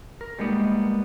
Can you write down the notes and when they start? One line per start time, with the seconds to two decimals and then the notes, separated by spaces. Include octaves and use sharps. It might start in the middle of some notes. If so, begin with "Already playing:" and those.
0.21 A#4
0.39 G3 G#3 A#3 B3 D#4